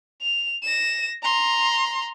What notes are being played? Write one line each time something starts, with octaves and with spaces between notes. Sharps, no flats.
F7
A#6 E7
A#5 C6